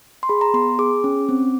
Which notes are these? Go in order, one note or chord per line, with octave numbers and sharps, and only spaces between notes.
C6
G#4 B5
A#5
B3 C6
G#4 D6
C#4
C4